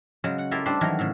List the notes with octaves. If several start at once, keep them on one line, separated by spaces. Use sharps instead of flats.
C#3 F#3 G#3
F#5
E4 F4 G4 A4 A#4
G3 A3 D4 G4 C5
D#3 E3 F#3 F#4 A#4
A2 C#3